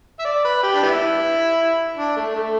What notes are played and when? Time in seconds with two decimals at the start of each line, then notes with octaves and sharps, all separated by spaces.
0.19 E5
0.25 D5
0.45 B4
0.63 G4
0.75 D4
0.83 G3 B3 E4
1.97 D4
2.16 A3
2.35 A3